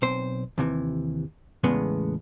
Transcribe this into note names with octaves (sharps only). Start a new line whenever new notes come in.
B1 C4 C5
D#2 C3 E3
E2 A2 C#3 G#3 B3